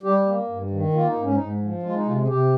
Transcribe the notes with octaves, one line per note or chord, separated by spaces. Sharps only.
G3 G4
A#3
G2
D#3
A#3 F4
D#4
G#2
C#4
G#2 D#4
F3
G#3 F4
D#4
C3 F4
G#4
C3 G4